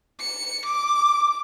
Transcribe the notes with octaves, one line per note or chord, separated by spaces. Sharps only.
C#7
D6